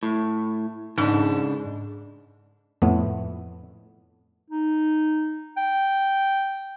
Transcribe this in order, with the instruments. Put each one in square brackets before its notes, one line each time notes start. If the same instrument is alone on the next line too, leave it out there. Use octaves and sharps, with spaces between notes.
[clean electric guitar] A2
[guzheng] G#2 [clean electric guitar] C#3 D4
[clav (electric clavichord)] F2 A2 A3 B3
[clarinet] D#4
G5